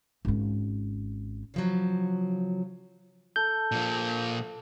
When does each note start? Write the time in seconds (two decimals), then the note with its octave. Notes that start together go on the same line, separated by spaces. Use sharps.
0.25 G#1 C#4
1.54 C#3 F3 F#3
3.36 A4 G6
3.72 A#2 F3